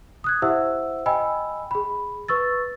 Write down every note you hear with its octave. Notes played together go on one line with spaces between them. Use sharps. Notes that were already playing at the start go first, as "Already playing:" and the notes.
D#6 F#6 G#6
E4 G4 C5 E5 F#5 E6
D#5 G5 G#5 B5 E6
G#4 B5
B4 C#6 E6 A6